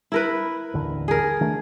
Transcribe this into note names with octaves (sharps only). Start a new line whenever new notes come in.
E4 A#4 B4
A1 D#2 D3
G#4 A#4
D#3 A3 D4